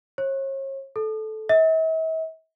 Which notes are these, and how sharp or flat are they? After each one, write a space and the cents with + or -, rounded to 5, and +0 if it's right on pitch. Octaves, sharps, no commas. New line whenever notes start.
C#5 -40
A4 -15
E5 -45